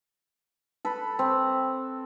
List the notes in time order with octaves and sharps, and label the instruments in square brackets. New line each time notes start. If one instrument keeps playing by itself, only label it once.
[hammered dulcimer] A4 B4
C4